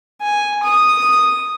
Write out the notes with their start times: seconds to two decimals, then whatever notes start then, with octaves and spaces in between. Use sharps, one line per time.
0.21 G#5
0.63 D#6